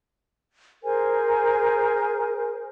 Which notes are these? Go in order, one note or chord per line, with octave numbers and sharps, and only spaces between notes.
G#4 A#4 C5 G#5